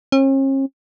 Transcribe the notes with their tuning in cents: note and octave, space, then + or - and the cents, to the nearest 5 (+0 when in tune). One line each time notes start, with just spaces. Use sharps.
C#4 -45